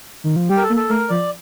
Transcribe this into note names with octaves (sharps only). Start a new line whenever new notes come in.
D#3
F3
G3 G4
A#4
A4
A#3
A4
A3 A#4
F3 D5